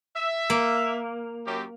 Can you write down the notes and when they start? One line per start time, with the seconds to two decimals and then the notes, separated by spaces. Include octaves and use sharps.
0.15 E5
0.50 A#3
1.46 F#2 G4